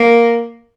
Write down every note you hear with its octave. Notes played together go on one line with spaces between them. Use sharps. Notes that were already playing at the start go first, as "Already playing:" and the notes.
Already playing: A#3